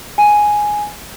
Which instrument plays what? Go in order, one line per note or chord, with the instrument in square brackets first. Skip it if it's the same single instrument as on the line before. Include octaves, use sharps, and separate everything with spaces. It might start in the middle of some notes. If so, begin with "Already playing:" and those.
[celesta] G#5